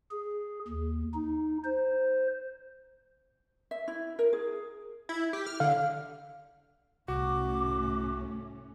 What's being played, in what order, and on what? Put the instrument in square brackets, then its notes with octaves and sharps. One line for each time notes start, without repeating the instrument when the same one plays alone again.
[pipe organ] G#4
D#2
D#4
C5
[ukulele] E5
E4
A#4
G#4
[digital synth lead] E4
G4
F6
[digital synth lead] D3 [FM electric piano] F5
[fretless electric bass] C2 [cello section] A2 A3 C#4 [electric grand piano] F#4 [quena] D6